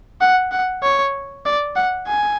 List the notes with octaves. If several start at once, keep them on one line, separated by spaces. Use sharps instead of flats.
F#5
F#5
C#5
D5
F#5
G#5